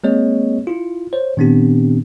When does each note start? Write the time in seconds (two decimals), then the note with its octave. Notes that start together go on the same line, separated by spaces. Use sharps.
0.04 G#3 A#3 C4 G#4 C#5 D#5
0.67 E4 F4
1.13 C5 C#5
1.37 A#2 D#3 B3 C4 D4 G4